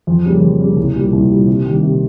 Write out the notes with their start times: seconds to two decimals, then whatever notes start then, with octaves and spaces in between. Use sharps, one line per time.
0.07 F2
0.25 C#3 G3 A#3
0.41 F2
0.59 C#3 G3 A#3
0.76 C2
0.95 A#2 G3 A#3
1.13 C2
1.30 A#2 G3 A#3
1.47 C3
1.65 D#3 G3 A#3
1.83 C3